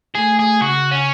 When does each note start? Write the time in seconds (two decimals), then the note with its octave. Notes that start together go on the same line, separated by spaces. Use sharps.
0.15 A3 G#4
0.39 G#4
0.61 C#3 F#4
0.91 C#4